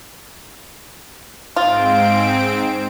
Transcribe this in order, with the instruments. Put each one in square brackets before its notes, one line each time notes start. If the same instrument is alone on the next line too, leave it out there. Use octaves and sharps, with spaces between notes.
[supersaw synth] G#2 C4 D7 [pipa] F4